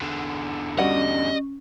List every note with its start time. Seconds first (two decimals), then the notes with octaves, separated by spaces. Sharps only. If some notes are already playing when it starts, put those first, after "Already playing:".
0.02 E2 D3
0.78 G3 C#4 F#4 D#5 F#5